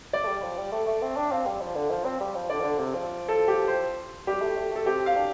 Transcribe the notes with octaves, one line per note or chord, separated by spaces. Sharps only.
D5
A3
G3
F3
G3
A3
A3
C4
D4
C4 F5
G3
F3
D3
F3
C4
G3
F3
D3 D5
F3
D3
C3
F3
A4
G4
C5
G3 G4
A3
A3
A3 A4
C4 G4
F5
D4